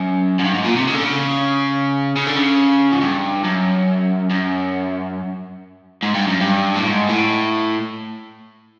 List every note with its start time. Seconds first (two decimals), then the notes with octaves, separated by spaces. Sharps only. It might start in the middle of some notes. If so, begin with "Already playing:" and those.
Already playing: F#2
0.40 F#2
0.45 G2
0.55 G#2
0.65 A#2
0.76 C3
0.88 C#3
0.95 D3
1.03 C#3
2.16 C#3
2.27 D3
2.35 C#3
2.92 G#2
3.01 G2
3.45 F#2
4.31 F#2
6.03 G#2
6.15 G2
6.28 F#2
6.41 G2
6.76 A2
6.88 G#2
7.09 A2